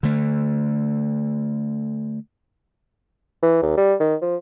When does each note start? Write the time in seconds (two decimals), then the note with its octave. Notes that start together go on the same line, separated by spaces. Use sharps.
0.03 D3 A3
3.43 E3
3.62 D#2
3.77 G3
4.00 D#3
4.22 F3